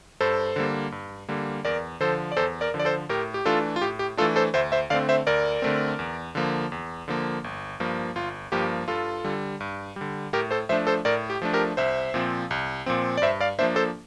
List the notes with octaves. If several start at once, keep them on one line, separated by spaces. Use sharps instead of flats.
G2 A4 C5
D3 G3 A#3
G2
D3 G3 A#3
E2 A#4 D5
D3 F3 A4 C5
D5
E2 A4 C5
A#4 D5
D3 F3
D5
A4 C5
A2 G4 A#4
G4
E3 A3 D4 F4 A4
F4
A2 G4
G4
E3 A3 D4 F4 A4
A4 C5
D2 C5 E5
C5 E5
D3 A3 C4 D5 F5
C5 E5
D2 A#4 D5
D3 A3 C4
E2
D3 F3 A#3
E2
D3 F3 A#3
G1
G2 F3 A#3
G1 F4
G2 F3 A#3 G4
G2 F4 A4
D3 G3
G2
D3 G3
A2 G4 A#4
A4 C5
F3 A3 D4 C5 E5
A4 C5
A2 A#4 D5
G4
F3 A3 D4
G4 A#4
C2 C5 E5
A#2 F3 C4
C2
A#2 F3 C4
D5
G2 C5 E5
D5 F5
F3 A#3 D4 C5 E5
A4 C5